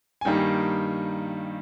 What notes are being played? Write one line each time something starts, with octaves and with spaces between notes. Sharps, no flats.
G#5
G2 D#3 G3 A#3 D#4 G5